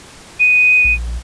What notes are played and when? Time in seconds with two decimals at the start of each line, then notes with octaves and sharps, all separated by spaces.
0.40 D#7
0.84 A#1